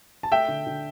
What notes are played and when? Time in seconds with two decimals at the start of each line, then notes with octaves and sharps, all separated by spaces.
0.23 A5
0.32 A3 E5 G5
0.48 D3
0.67 D3